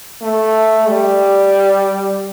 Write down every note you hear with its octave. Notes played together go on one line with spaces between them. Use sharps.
A3
G3